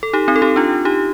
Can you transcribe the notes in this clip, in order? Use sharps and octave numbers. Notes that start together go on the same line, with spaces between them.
A4
D#4 G4
C4 D#4
A4
D#4 G4
D4 F4
D#4 G4